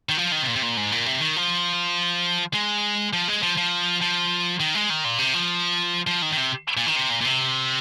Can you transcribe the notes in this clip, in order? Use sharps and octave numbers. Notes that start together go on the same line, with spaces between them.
D#3
F3
D#3
C3
A#2
C3
A#2
G#2
A#2
C3
D#3
F3
G#3
F3
G#3
F3
F3
F3
D#3
G#3
D#3
A#2
C3
F3
F3
D#3
D#3
C3
A#2
D#3
C3
A#2
A#2
C3